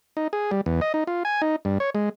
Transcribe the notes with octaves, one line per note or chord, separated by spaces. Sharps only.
D#4
G#4
G3
E2
D#5
D#4
F4
G#5
D#4
G2
C#5
G#3